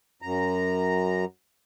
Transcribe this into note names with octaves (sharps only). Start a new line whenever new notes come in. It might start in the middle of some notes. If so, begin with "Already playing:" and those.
F#2 A#5